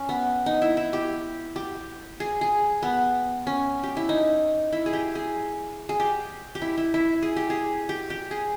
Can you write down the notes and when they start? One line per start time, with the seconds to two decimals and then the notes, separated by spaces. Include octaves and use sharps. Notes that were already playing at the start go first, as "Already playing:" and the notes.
Already playing: C#4
0.09 B3
0.46 D#4
0.62 E4
0.77 E4
0.93 G4
1.56 G4
2.20 G#4
2.41 G#4
2.83 B3
3.47 C#4
3.83 G4
3.97 E4
4.09 D#4
4.73 E4
4.86 G#4
4.93 G4
5.15 G#4
5.89 G#4
6.00 G4
6.55 G4
6.62 E4
6.77 E4
6.94 E4
7.23 G#4
7.36 G4
7.50 G#4
7.89 G4
8.10 G4
8.31 G#4